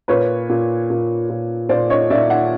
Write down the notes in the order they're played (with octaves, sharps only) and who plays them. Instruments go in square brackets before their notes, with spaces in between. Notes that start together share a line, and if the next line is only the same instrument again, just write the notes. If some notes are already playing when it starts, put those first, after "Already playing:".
[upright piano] A#2 B4 C#5
A#2
A#2
A#2
A#2 C5 D5
C#5 D#5
A#2 D5 E5
E5 F#5